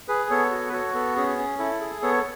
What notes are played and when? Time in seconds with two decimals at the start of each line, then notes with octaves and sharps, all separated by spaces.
0.08 G#4 B4
0.30 B3 A4 C#5
0.51 F#4
0.69 B4
0.73 F#4 A4 C#5
0.94 B3 A4
1.16 C#4 G#4
1.38 C#4
1.59 E4 A4
1.80 G#4
2.02 B3 A4 C#5